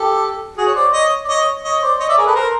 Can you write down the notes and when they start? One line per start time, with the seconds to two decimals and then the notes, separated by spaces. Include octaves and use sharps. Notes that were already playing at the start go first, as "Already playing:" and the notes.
Already playing: G4 A4
0.57 F#4 G#4
0.67 C#5
0.75 C5 D5
0.92 C#5 D#5
1.25 D5
1.28 C#5 D#5
1.64 C#5 D#5
1.82 C5 D5
2.00 C#5 D#5
2.09 D5 E5
2.18 G#4 A#4
2.26 A4 B4
2.35 A#4 C5